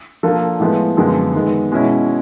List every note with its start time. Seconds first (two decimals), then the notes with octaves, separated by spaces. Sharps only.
0.23 F3 A#3 D4 F4 A4
0.60 A2 F3 G#3 B3
0.97 F#2 D3 F3 G#3 B3
1.34 D#3 G#3 B3
1.72 B2 G#3 C#4 E4